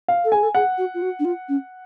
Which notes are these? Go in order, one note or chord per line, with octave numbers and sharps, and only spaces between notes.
F5
A4
G#4 G#5
A4
G#4 F#5
F#4
F4
F#4
D4
F4
C#4